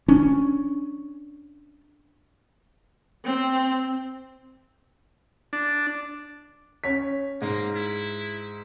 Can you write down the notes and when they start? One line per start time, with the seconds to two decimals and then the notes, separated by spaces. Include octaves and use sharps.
0.08 C#4 D4
3.25 C4
5.53 D4
6.84 C#4 C#5 B6
7.42 G#2 A#3
7.76 E4